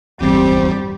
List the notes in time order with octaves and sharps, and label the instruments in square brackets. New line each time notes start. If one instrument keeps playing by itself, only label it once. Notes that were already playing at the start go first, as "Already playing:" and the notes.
[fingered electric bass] D1 G1 E2 [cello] G3 G4 [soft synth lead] C4